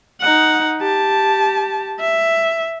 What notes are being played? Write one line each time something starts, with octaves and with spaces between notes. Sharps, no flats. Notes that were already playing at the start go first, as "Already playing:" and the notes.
D#4 F#5
G4 A5
E5